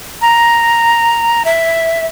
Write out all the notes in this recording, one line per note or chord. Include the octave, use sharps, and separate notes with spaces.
A#5
E5